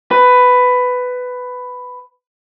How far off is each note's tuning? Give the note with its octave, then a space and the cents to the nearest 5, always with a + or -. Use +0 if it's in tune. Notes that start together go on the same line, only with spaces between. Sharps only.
B4 +10